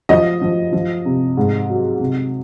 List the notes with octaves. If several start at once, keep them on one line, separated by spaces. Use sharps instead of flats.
F3 D#5
F3
F3
C3
G#2
F#3
C3